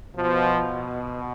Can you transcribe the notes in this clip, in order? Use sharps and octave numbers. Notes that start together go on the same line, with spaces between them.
B2 F3